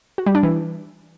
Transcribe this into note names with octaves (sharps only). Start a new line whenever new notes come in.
F#4
G3
D4
E3